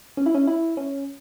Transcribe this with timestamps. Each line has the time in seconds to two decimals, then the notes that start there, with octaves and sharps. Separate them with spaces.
0.17 C#4
0.26 E4
0.35 C#4
0.47 E4
0.77 C#4